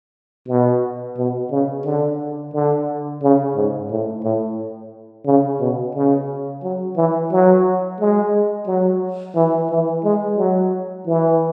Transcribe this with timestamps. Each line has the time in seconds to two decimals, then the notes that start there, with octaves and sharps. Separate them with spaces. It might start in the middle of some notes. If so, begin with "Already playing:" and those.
0.48 B2
1.17 B2
1.51 C#3
1.85 D3
2.54 D3
3.22 C#3
3.55 G#2
3.90 A2
4.24 A2
5.26 C#3
5.60 B2
5.95 C#3
6.63 F#3
6.96 E3
7.31 F#3
8.00 G#3
8.67 F#3
9.35 E3
9.70 E3
10.04 G#3
10.38 F#3
11.06 E3